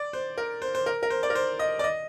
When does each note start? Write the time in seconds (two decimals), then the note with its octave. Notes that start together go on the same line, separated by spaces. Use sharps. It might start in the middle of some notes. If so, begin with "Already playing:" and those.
Already playing: D5
0.13 C5
0.38 A#4
0.62 C5
0.75 C5
0.86 A#4
1.03 A#4
1.10 C5
1.23 D5
1.30 A#4
1.35 C5
1.59 D#5
1.79 D5
1.84 D#5